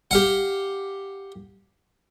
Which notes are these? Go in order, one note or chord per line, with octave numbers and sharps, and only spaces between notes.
G4 F5 F#5